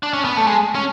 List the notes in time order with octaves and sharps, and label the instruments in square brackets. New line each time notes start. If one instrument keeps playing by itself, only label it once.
[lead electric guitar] D4
C#4
B3
A3
G#3
C#4